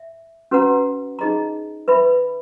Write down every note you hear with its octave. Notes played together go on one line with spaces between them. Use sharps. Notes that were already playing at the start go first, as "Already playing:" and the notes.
Already playing: E5
C#4 F#4 B4 F#5 A#5
D#4 G#4 D#5 A#5
B4 E5 B5